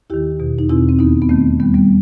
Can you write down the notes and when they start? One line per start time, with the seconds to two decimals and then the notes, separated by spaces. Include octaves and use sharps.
0.10 D#2 D#3 E4 G4
0.40 E2 B2
0.59 D#4
0.70 E2 B2 C4 E4
0.89 C4
0.99 D#2 D#3 B3 D#4
1.22 B3
1.29 D#2 D#3 A3 C4
1.60 D#2 D#3 G3 B3
1.74 G3 B3